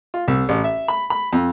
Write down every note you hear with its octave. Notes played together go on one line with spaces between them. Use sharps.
F4
C2
A1
E5
B5
B5
F2